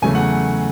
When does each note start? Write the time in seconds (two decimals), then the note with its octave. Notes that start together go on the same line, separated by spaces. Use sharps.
0.02 E2 C#3 F#3 A3 G#5
0.15 F#5